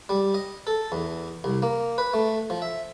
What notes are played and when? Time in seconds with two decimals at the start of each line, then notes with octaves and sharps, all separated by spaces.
0.09 G3
0.34 D#5
0.67 A4
0.92 E2
1.44 C2
1.62 A#3
1.98 B4
2.13 A3
2.50 F3
2.62 E5